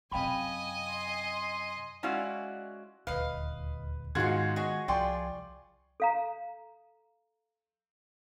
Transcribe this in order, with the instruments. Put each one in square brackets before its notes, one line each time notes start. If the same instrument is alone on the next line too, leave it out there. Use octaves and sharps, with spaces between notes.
[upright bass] F#2 C3 [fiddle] D#5 G#5 [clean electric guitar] F5 G5 B5
[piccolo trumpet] C6
[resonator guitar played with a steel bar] G#3 C#4 E4 F#4 D5 F5
[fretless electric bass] D#1 D2 [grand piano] B4 [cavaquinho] D#5 F5
[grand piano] G#2 F#4 G#6 [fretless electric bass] D#3 G#3 B3 [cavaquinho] F4 G#4
[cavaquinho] F#4 G#4 C#5 [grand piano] D#5
[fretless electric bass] C2 F3 [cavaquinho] F4 G#4 G5 [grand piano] D5 C6 C#6
[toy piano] A4 F5 A#5